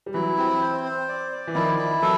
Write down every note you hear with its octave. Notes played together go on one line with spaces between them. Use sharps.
G3
E3 F#3 E4
C4
C5
C5
D5
D5
E3
D#3 F3 E4
E4
E3 F#3 A4